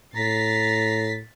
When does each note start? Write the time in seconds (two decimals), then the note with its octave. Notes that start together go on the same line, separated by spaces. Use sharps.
0.16 A2 A#5 A6 B6 C7